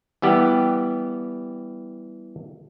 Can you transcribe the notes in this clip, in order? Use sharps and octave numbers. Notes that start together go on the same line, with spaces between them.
E3 G3 B3 G4